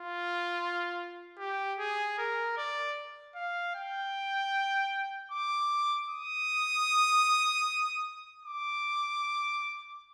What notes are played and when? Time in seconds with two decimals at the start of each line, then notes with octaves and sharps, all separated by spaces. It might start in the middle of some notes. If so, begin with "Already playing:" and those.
Already playing: F4
1.39 G4
1.79 G#4
2.18 A#4
2.57 D5
3.35 F5
3.75 G5
5.31 D6
6.09 D#6
8.45 D6